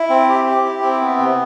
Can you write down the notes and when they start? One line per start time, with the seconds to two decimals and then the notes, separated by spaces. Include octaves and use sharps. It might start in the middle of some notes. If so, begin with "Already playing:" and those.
Already playing: E4
0.10 C4
0.29 G4
0.47 G4
0.65 E4
0.82 C4
1.01 B3
1.19 C3